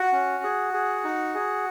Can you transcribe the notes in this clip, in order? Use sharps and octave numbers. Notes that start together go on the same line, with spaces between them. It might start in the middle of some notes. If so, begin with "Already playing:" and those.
Already playing: F#4 F#5
C#4
G#4
G#4
D#4
G#4